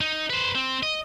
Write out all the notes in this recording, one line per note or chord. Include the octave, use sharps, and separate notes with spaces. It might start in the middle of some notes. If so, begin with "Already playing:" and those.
D#4
B4 C5
C4
D#5